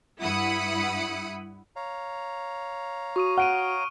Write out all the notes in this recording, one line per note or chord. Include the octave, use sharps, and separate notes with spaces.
G2 E4 F#5 B5 D#6 C#7
C#5 F5 A#5
F#4 C#6 D#6 D#7
F#5 F6 D7 D#7